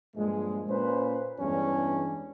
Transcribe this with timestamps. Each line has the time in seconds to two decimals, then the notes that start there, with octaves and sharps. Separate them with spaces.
0.15 G2 A#2 F3 G#3
0.68 A#2 C#4 B4 C5
1.39 E2 G2 E3 G#3 C#4 D4